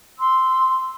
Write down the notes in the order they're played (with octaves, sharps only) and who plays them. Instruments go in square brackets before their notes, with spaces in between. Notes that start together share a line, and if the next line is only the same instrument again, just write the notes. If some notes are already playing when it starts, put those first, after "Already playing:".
[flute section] C6 E6